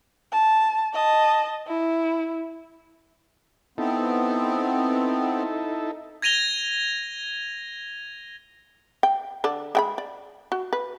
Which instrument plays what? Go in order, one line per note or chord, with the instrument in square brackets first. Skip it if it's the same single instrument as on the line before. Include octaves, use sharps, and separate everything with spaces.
[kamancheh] A5
D#5 A5
E4
[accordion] B3 C4 [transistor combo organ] D#4 E4 A4
[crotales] G#6 A#6 D#7 F7 G7
[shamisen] G5
D3 A4 D5
G#3 G5 B5
D5
F#4
B4